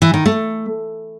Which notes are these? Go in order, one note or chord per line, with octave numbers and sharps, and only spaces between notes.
E3
D#3
A3